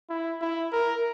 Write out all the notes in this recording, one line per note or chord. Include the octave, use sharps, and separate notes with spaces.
E4
E4
A#4